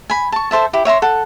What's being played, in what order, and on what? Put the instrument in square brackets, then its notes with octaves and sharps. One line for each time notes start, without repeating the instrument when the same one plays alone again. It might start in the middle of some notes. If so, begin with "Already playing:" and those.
[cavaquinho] G#5 B5
A5 C#6
A4 C5 E5 A5
E4 G4
C#5 E5 A#5 C6
A4 F#5